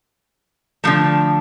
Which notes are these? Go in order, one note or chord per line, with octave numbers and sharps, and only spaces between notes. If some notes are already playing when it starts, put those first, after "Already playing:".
D3 F3 A3